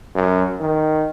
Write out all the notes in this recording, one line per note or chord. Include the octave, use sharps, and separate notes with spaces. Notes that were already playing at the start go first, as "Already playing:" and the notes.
F#2
D#3